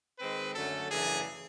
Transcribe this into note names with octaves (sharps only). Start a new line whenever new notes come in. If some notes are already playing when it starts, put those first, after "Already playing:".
D#3 G#3 C4 B4
F#2 D3 F#3 A3 C#4 A4
F#2 C#3 E3 A3 D4 G#4